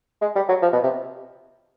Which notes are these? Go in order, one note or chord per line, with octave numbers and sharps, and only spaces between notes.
G#3
G3
F#3
F3
B2
C3